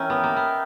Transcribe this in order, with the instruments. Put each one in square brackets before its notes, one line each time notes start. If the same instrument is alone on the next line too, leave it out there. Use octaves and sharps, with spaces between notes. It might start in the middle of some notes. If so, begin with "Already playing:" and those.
Already playing: [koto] E3 C#4 [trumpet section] D#4 A#4 E5 G5
[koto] B3
A#3
B3